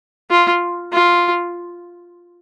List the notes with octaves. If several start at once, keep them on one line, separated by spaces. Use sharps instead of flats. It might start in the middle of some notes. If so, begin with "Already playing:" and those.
F4
F4